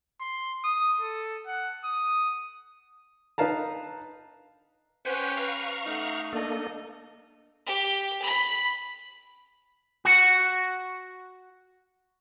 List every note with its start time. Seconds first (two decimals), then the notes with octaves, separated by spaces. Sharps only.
0.21 C6
0.65 D#6
1.01 A4
1.47 F#5
1.85 D#6
3.38 D#4 B4 F5 A5 A#5
5.05 C#4 G4 B4 C5 F#5 G#5
5.37 B4 F5 A#5 C#6
5.86 A3 D#4 F#5
6.33 A#3 D4 A4 D#5
7.67 G4
8.22 B5
10.05 F#4 F#5